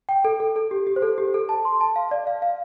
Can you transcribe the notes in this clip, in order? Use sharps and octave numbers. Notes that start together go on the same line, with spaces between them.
G5
A4
A4
A4
G4
G4
C5
A4
G4
A4
A5
C6
A5
F5
D5
F5
F5